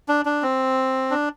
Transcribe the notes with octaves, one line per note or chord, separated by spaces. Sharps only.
D4
D4
C4
D4